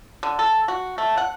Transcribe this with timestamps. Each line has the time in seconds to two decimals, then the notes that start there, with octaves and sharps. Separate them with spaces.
0.23 D3
0.39 A4
0.68 F#4
0.98 A3
1.17 F#5